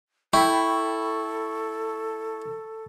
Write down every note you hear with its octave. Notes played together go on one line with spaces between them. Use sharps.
E4 A4 G5 B5 C#6